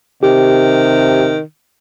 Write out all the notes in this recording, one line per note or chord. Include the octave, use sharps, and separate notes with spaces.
C3 D#3 G4